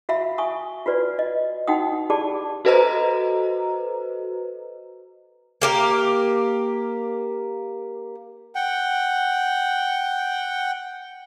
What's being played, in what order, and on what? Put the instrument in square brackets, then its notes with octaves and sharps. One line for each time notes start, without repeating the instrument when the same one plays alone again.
[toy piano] F#4 E5 F5 B5
G#5 C#6 D#6
F4 F#4 B4 D5
D#5
D#4 F#4 F#5 G5 D#6
G4 G#4 D5 A5 B5 D6
[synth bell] F#4 A4 B4 C5 D#5 A#5
[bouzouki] A#3 G4 A#4
[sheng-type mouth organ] F#5 G5